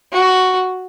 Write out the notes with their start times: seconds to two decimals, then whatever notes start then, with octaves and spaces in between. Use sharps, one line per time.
0.13 F#4